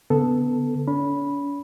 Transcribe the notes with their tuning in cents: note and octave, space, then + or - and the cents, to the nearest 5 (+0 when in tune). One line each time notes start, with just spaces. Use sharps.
D3 -35 B3 +5 A4 +0
C#4 +45 B5 -10